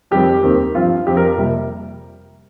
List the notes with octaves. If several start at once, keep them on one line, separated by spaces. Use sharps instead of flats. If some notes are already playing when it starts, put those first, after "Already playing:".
F2 D#3 G3 C4 G4
D#2 D#3 C4
G2 F3 C4 F4
F2 F3 C4 G4
A#4
F2 C3 G3 A#3